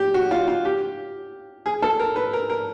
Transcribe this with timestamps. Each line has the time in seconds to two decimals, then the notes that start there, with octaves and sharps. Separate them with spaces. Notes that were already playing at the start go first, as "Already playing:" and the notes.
Already playing: G4
0.14 F#4
0.31 F4
0.48 F4
0.65 G4
1.66 G#4
1.82 A4
1.99 A#4
2.16 B4
2.33 A#4
2.50 A#4